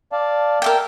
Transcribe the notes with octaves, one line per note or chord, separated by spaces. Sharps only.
D5 F5 A5
A#4 E5 G5